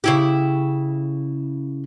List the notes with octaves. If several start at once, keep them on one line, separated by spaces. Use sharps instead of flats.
C#3 E4 G4